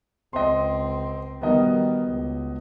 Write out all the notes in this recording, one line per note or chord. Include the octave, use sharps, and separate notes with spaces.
C#2 C4 D#5 C6
D#3 G3 B3 F#4 D#5
D#3
C#2